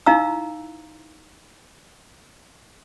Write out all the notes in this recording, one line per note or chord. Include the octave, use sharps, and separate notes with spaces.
D#4 E4 F5 A#5 E6